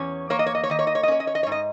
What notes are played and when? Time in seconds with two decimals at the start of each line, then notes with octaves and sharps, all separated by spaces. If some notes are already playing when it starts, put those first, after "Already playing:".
Already playing: E2 C#4 C#5
0.30 A#3 C#5
0.39 D#5
0.46 C#5
0.55 D#5
0.63 C#5
0.70 D#3 D#5
0.79 C#5
0.87 D#5
0.95 C#5
1.03 D#5
1.08 C#4 C#5
1.20 D#5
1.27 C#5
1.35 D#5
1.43 C#5
1.47 G#2
1.52 D#5